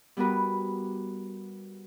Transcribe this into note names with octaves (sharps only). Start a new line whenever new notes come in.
G3 B3 F#4 A#4 B4